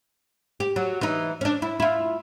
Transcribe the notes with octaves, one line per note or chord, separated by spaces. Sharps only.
G4
F#3
E3 D#4
C#4 D4
E4
E4 F4